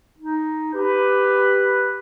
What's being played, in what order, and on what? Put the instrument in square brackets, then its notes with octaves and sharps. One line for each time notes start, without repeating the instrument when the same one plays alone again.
[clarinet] D#4
[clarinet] G4 [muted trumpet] B4